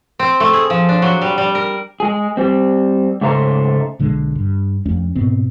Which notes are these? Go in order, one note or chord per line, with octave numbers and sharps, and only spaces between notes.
C4
A3
G#4
F3
D4
F#3
G3
G3
A#4
G#3 G#4
G3 C4
G#2 C#3 A3 C5 A#5
B1 D3 G#3
G2
F2 A3 C#4
G#2 B2 B3 C4